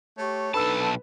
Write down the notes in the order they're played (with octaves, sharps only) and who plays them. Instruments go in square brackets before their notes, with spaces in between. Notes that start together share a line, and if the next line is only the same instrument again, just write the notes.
[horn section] A3 G4 C#5
[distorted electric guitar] B1 A5 [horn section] D4 D#4 A4 [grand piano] B4 E6